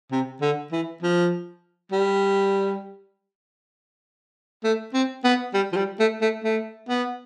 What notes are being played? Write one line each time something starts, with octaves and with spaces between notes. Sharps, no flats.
C3
D3
E3
F3
G3
A3
C4
B3
G3
F3
G3
A3
A3
A3
B3